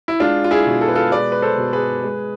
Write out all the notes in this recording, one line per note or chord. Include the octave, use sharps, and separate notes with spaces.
E4
G#3 D4 F4
F4
E4 G#4
B2
A4
B4
F4 A4
G#3 B4 D5
B4
A4 C5
B2
G#4 B4
G#3